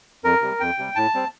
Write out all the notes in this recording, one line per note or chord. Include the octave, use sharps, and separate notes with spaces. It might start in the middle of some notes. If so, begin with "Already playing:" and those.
F2 A#4
C3 G3
F2 G5
C3 G3
A2 A5
G3 C4